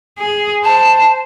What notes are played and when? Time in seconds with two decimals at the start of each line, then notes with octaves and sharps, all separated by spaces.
0.18 G#4
0.64 C5 A5